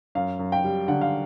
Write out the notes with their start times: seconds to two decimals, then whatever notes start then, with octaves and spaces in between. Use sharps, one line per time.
0.15 F#2 F5
0.39 F#2
0.52 G5
0.64 G3
0.88 D3 F#5
1.01 F5